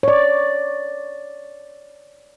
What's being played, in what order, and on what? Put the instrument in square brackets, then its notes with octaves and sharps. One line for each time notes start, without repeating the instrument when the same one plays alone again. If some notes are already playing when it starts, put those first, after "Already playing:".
[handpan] C#5 D5